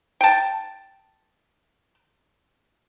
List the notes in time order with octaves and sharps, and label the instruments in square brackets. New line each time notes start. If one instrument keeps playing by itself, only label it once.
[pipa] G5 A5